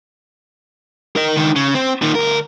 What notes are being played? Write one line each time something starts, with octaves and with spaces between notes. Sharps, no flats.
A#4 D#5
C#2 D#3
C#3
C4
A#2 D#3
D2 A#4